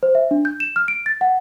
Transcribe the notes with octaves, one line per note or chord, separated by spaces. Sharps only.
C5
E5
D4
G6
E7
F6
D7
A6
F#5